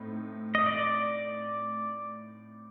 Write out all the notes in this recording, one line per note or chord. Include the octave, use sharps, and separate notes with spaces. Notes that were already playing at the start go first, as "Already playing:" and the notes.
Already playing: A2 A3 C4 D#4
D#5
D5